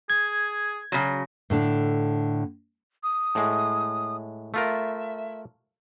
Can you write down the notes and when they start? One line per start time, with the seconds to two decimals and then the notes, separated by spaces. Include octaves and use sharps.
0.10 G#4 G#6
0.92 C#3 F#3
1.50 A2 D3 D4
3.03 D#6
3.35 A2 G#3
4.54 A3 F4 A#4 E5